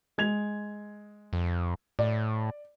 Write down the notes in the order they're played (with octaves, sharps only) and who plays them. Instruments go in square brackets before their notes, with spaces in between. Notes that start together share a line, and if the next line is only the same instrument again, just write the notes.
[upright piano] G#3 G#6 F7
[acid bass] F2
[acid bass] A2 [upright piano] D5